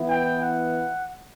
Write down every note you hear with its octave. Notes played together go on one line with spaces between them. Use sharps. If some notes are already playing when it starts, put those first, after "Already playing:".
Already playing: E3 B3 E4
G5
F#5